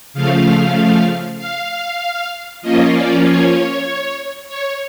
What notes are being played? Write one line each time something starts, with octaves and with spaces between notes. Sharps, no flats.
C#3 F3 A3 F5
F5
F3 A#3 C#4 F4 D#5
D5
C#5
C#5